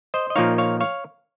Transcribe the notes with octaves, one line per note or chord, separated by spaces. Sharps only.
C5 D#5
D#5
A#2 F3 A#3 D#4 C#5 F5
C#5 F5
C#5 F5